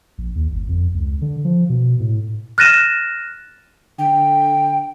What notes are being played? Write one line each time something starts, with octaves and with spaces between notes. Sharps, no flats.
A#1
D#2
G1
F2
C#2
D3
F3
B2
A2
F6 F#6 A6 A#6 D#7 E7
D3 G5